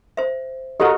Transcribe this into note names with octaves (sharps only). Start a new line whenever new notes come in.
C5 E5
F#4 G4 A4 A#4 C#5 D#5